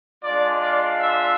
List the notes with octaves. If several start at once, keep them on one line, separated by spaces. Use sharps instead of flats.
G#3 D4 F4 D5
D5
E5